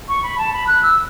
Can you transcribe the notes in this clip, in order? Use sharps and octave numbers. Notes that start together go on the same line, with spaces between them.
C#6
B5
A5
B5
F#6
E6